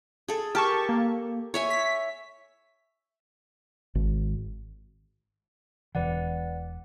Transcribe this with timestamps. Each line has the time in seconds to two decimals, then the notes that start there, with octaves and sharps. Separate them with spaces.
0.28 G#4 A4
0.55 G4 A#4 A5 C#6
0.89 A#3
1.54 C#5 E5 G#5
1.70 B6
3.95 G#1
5.95 E1 B2 E3 B4 D5 F#5